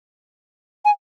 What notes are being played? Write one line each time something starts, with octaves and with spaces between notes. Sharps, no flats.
G#5